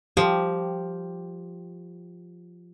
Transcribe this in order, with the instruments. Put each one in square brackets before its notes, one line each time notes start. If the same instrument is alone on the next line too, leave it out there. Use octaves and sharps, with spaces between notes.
[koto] F3 [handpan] G4